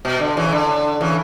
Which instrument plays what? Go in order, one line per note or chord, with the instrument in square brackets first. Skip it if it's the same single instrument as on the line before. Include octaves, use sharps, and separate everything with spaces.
[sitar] B2
D3
C#3 E3
D3
C#3 E3